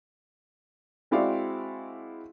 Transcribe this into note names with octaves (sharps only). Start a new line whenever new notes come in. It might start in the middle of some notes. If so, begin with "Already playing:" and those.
G#3 C4 E4 F#4 D5 F5